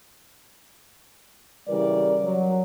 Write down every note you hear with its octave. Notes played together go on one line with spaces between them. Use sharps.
C#3 E3 G3 A#4 D5
F#3